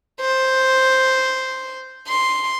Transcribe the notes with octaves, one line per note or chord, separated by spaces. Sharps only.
C5
C6